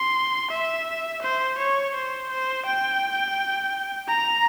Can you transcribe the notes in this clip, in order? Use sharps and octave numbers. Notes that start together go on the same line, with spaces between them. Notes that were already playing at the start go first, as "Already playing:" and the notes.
Already playing: C6
E5
C5
C#5
C5
C5
G5
A#5